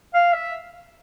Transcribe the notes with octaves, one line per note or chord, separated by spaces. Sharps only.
F5
E5